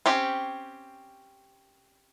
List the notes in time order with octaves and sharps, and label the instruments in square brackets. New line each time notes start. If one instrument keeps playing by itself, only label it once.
[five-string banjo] C4 C#4 G4